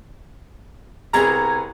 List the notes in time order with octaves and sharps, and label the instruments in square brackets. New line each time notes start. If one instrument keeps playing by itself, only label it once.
[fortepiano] C2 B3 G#4 [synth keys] A#5 G#6